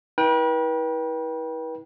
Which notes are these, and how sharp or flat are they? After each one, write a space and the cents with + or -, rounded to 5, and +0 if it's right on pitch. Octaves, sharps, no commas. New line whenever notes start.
E4 -30 B4 -40 G5 +0